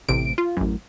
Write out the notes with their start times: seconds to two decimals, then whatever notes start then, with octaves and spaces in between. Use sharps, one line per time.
0.09 A1 C3 D7
0.38 F4
0.57 A1 F#2